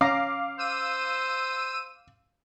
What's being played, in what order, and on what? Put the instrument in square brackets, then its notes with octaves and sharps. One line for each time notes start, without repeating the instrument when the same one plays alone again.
[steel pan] C#4 A#5 [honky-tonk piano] F5 D6
[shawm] C5 [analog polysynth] E6 D#7